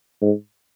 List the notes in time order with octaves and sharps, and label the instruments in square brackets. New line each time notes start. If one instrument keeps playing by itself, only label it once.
[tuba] G#2